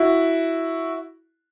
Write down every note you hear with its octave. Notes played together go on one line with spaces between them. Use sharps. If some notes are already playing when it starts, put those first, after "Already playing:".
Already playing: E4 F#4